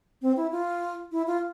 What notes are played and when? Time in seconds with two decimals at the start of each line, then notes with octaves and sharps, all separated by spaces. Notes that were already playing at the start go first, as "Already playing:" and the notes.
0.22 C4
0.37 E4
0.52 F4
1.12 E4
1.27 F4